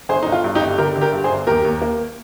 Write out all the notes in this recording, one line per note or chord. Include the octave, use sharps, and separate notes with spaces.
G1 G#4 C5
G1 D#4
F4
G2
D#4 G4
G1
D3 G4 A#4
D3
G4 A#4
G2
G#4 C5
G1
D#2 G4 A#4
D#2
A#3